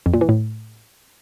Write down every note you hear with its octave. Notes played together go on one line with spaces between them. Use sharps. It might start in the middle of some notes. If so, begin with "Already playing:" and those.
F2
A#2
E3
A2